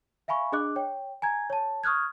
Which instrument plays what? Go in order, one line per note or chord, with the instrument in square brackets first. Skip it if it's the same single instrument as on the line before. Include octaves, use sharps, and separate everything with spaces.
[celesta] E5 F5 G#5 B5 C#6
D4 G#4 D#5 D6 F#6
C#5 G5
G#5 A#5 G#6
C#5 A5
C#6 D#6 F6 F#6 G#6